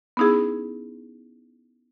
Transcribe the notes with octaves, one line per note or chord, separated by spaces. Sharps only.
B3 C#4 D#4 E4 G#4